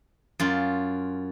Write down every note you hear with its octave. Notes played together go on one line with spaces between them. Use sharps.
F#2 F4